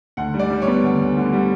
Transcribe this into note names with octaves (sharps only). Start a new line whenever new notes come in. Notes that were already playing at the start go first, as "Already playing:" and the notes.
D2 F#5
G3
D5
G3
C#5
B3
D2
D2
D3
G3